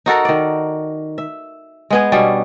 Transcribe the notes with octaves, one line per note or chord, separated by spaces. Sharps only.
D#4 F#4 A4 A#4
D#3 D5
E5
G#3 B3 G#4
B2 G3 C#4 D4